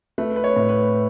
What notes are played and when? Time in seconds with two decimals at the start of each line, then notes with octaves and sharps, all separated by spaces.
0.18 A3 B4
0.36 B4
0.44 C#5
0.56 A2
0.69 B4